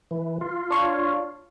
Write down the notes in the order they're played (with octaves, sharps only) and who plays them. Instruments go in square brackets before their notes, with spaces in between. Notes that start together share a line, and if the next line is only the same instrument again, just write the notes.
[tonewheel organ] E3
F4
[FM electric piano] D4 C#5 F5